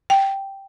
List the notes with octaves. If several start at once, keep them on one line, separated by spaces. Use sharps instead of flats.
G5